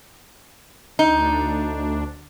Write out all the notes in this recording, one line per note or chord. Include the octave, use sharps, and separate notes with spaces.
D2 D4 D#4